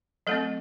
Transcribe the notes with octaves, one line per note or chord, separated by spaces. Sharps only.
F#3 A3 C4 A4